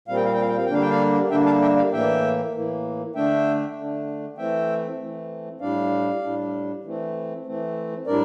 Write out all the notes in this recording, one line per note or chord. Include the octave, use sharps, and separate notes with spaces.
A#2 G3 C4 F5
G5
F5
G5
F5
G5
F5
G5
D3 G3 A#3 D4 F5
G5
D5 F5
D3 G3 A#3 D4 E5 G5
F5 A5
E5 G5
D5 F5
A2 E3 A#3 E5 G5
A2 E3 A#3
D3 A3 D4 E5 G5
D3 A3 D4
E3 A3 C4 E5 G5
E3 A3 C4
A2 G3 D4 D5 F5
A2 G3 D4
E3 A3 C4
E3 A3 C4
A2 G3 D4 A#4 D5